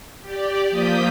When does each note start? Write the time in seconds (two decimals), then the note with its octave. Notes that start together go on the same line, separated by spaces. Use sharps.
0.21 G4 D5
0.70 F3 A#3 D#6 G6 B6